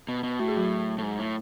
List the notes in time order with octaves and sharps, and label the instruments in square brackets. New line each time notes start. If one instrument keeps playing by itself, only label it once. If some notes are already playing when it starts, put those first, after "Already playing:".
[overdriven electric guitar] B2
B2
[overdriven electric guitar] A2 [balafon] F#4
[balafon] G#4
F#3 F#4
[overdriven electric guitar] A2
G#2
A2